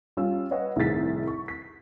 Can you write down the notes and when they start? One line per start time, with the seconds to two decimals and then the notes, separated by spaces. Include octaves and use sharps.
0.17 G3 C#4 F4 E6
0.51 B4 C#5 D#5 F#5
0.76 C2 A2 D#3 G#4 A6 B6
1.27 C#6
1.48 B6